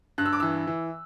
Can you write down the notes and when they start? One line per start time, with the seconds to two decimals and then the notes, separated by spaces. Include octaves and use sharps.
0.18 G2 F#6
0.25 E6
0.33 D6
0.40 E3 E6
0.67 E3